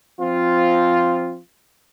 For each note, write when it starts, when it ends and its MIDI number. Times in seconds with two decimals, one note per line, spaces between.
0.20 1.38 53
0.20 1.38 60
0.20 1.38 65